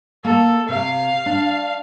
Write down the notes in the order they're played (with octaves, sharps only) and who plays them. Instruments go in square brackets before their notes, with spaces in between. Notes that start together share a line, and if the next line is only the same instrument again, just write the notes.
[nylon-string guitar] A#3 [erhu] A4
[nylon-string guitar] C3 [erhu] F5
[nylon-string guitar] D4